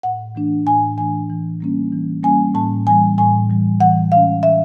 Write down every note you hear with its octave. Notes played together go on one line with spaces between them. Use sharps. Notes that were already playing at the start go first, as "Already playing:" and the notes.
A2 F#5
E3 A3 D4
A2 G#5
E3 A3 D4 G#5
E3
G3 A#3 C#4
E3
G3 A#3 C#4 G#5
A2 A5
E3 G3 G#5
A2 G#5
E3 G3
E3 F#5
G#3 C#4 F5
E3 E5